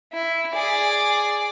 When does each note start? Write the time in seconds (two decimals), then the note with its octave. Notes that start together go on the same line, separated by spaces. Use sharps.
0.13 E4
0.54 G#4 D5